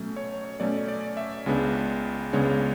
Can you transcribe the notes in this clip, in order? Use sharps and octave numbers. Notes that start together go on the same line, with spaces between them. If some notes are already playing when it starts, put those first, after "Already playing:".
Already playing: B2 F#3 A3 C#4
C#5
C#5
B2 F#3 A3 C#4 D5
D5
E5
C#2 C#3 G#3 B3 D4
C#2 C#3 G#3 B3 D4 C#5